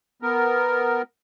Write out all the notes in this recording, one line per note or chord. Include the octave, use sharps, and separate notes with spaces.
B3 A#4